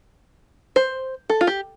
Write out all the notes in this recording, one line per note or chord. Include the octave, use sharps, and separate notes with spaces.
C5
A4
F4
G4